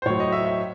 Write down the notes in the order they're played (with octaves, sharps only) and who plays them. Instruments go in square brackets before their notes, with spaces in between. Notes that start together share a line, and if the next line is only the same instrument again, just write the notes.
[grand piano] C5
A2 F#3 C#5
D#5
E5
E5